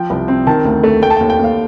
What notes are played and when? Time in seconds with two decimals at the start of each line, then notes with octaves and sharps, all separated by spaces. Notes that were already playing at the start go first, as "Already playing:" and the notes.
Already playing: F3 G5
0.10 C2
0.28 C4
0.47 D#3 A5
0.65 D2
0.84 A3
1.02 A3 G5
1.10 A5
1.17 D#2 G5
1.30 G5
1.39 D#2 F5